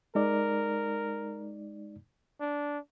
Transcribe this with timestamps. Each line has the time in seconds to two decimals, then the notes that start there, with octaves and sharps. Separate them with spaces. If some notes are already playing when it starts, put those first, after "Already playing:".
0.15 G#3 D#4 A#4 D5
2.41 D4